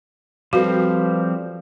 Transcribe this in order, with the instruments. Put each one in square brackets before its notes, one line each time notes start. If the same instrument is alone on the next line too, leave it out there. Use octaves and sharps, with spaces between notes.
[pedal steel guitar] F3 G3 C4 [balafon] F#4 [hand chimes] A4 B4 F5